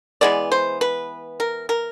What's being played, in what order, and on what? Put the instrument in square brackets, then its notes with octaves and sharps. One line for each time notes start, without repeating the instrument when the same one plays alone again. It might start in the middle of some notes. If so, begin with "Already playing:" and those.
[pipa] E3 G#3 B3 D5
C5
B4
A#4
A#4